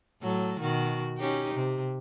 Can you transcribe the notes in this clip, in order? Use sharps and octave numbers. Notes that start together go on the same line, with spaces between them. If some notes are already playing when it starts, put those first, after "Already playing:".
A2 F#3 A4
B2 D#3 F#4
C#4 D#4 G4
C3